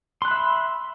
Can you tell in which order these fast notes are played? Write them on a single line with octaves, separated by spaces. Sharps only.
C6 F#6 B5 E5